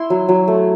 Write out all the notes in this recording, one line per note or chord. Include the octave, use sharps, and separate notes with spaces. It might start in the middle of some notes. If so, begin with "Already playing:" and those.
Already playing: E4 C6
F#3
F#3
A3